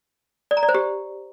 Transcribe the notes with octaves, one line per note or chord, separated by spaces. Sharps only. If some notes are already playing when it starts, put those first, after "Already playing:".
D5
A#5
D5
C5
G4